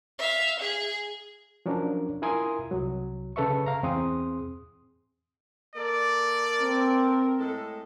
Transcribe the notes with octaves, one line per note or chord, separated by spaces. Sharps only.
E5 F5
G#4
F3 F#3 C#4 D4 A#4
E4 F4 A#4 G#5 C6 D#6
C2 F#3
C#3 A4 B4 E5 C#6
F5 A#5
E2 C4 G#4 C6 D#6
A#3 A4 A#4 D5
C4
A2 G#3 A4